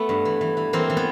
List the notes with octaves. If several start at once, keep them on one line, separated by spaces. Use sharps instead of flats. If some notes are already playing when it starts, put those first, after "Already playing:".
Already playing: A3 B3
G2
E3
E3
E3
E3 A#3 C4
E3
B3